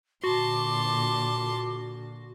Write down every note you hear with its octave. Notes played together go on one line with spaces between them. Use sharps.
A#2 D3 F#4 A5 C6 D6